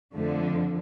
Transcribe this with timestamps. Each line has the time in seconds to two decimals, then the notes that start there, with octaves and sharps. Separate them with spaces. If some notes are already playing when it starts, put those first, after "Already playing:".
0.13 F2 D3 F3 A3